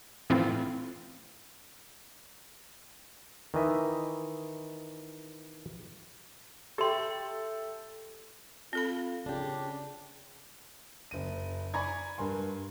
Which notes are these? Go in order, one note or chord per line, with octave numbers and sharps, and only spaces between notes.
A2 E3 C4 E4 F4
D#3 E3 D#5 E5
G4 A4 E5 G5 C6
C4 F4 A4 B5
C#3 D4 G4
F#1 D#7
D5 G#5 A#5 B5 C#6 G#6
G2 A#4 G#5 C6